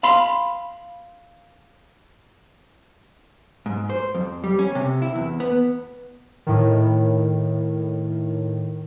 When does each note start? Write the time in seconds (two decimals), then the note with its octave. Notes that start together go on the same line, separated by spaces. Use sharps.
0.03 F5 B5 C6
3.66 G#2
3.90 C5
4.15 F2
4.44 G3
4.59 C#4
4.75 C3
5.02 E4
5.15 E2
5.40 B3
6.47 A2 D#3